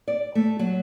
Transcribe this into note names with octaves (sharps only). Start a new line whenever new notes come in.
D5
A3
F#3